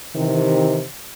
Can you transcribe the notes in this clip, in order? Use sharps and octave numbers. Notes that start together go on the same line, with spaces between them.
C3 D#3 E3